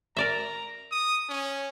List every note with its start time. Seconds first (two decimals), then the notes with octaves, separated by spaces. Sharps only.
0.17 A#4 D5 E5 A#5
0.91 D#6
1.29 C#4